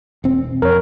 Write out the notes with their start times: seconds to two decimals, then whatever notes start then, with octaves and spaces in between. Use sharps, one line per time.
0.24 E1 C4
0.62 F2 A#4 C#5